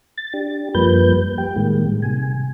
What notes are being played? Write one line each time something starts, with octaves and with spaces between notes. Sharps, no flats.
A6
D4 G4
F#2 F3 G3 A#3 B4 G6
G4 G5
A2 D#3 G3 G#3 A#3
C3 G#5